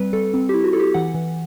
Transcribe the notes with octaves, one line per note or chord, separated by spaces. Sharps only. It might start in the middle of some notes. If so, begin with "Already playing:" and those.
Already playing: G3 C4 B4
G3 A4
C4
E4 G4
F#4
E4 A4
G4
E3 F#5
E3